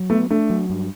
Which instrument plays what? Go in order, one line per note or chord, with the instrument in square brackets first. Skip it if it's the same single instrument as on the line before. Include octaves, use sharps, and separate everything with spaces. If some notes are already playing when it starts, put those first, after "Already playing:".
Already playing: [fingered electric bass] F#3
[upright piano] A3 [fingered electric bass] B3
[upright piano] A3 [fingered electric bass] D4
[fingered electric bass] F#3
G2